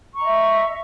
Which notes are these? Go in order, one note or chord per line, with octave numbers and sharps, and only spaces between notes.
D#5 E5 A#5 C#6